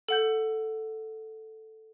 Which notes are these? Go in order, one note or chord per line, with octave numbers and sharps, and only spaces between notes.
A4 F#5 G6